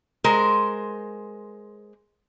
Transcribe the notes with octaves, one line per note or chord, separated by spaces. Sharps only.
G#3 A#4 C5